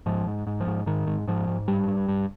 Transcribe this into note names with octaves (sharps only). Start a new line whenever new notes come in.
G#2 F3
G#2
G#2
F3
G#2
G#2 D#3
G#2
G#2 F3
G#2
G2 G3
G2
G2